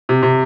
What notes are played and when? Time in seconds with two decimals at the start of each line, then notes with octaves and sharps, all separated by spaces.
0.09 C3
0.23 C3